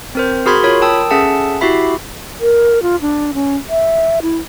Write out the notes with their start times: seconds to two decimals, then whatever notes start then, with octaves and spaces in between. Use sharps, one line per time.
0.15 C4 A#4 C5
0.46 F#4 G#4 A#4 B5 C6 G#6
0.64 F4 A#4 C#5 B5
0.81 A#4 G5 A5 D#6 E6
1.10 C#4 G#4 A4 E5 F#5 A5
1.61 E4 F#4 G4 E5 B5
2.41 A#4
2.82 F4
3.01 D4
3.34 C#4
3.69 E5
4.22 E4